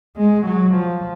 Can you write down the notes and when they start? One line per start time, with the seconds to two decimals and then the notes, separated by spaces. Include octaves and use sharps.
0.16 G#3
0.46 F#3
0.75 F3